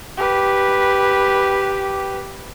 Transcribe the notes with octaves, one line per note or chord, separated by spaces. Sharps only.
G4 B4